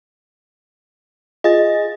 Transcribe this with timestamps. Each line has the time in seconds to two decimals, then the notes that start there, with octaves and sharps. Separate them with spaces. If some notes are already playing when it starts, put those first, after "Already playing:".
1.44 F4 G#4 D#5 A6